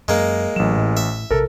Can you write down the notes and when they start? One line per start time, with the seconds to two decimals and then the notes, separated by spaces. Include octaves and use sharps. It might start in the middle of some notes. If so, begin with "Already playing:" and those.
0.08 F#2 G#3 A#3
0.56 A1 F#3 E7
0.77 A2
0.97 E5
1.31 A#1 C3 A4 A#4